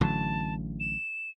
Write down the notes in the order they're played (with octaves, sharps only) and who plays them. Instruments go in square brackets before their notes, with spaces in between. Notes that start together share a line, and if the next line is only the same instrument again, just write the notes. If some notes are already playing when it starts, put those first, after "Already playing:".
[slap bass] A1 D3 F#3 [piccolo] A5
[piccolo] E7